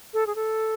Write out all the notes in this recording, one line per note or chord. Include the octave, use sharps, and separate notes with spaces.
A4
G#4
A4